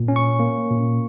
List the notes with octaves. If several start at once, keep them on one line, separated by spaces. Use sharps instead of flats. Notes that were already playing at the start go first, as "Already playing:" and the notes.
Already playing: A#2
C#4
C#6
A#3
A#2